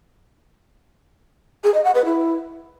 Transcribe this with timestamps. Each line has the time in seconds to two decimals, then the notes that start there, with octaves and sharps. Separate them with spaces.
1.64 G#4
1.74 D#5
1.84 F#5
1.95 B4
2.05 E4